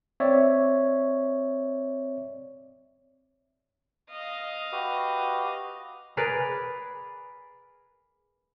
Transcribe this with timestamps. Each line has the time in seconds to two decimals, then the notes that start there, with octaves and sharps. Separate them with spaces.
0.20 C4 C#5 D5 E5
4.10 D#5 F5
4.72 F#4 G4 B4
6.17 G#4 A#4 B4 D5